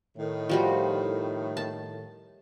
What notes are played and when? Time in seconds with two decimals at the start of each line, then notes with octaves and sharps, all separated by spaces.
0.17 A2 D#3
0.49 F3 G3 F#4
1.57 A5